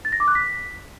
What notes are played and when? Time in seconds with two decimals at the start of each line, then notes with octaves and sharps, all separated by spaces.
0.05 A6
0.12 A#6
0.20 D6
0.28 F#6
0.35 B6